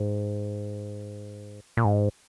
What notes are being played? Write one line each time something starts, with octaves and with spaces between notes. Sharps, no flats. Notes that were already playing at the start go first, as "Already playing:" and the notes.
Already playing: G#2
A#2
G#2